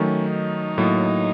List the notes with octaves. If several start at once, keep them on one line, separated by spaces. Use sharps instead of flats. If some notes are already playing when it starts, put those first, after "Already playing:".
Already playing: D#3 F#3 A3 C#4
D#4
A2 F#3 A#3